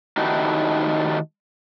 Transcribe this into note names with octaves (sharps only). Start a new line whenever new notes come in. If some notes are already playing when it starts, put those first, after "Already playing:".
D#3 A3 D#4 E4 F#4 G4